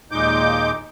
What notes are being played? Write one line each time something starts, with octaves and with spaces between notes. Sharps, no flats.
D#2 A#2 G#3 D#4 D6 G6